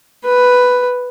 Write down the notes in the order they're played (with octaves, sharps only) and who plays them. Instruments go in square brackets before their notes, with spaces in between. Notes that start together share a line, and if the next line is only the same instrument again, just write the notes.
[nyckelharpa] B4